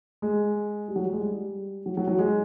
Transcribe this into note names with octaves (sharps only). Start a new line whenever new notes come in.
G#3
G3
F#3
G3
G#3
G3
F#3
F#3
F#3
G#3